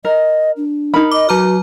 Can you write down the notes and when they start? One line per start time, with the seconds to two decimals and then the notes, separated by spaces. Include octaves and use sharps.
0.05 A#4 D#5
0.56 D4
0.94 D#4 A#4 B5
1.12 D#5 D6
1.29 F#3 F#4 A#5 F6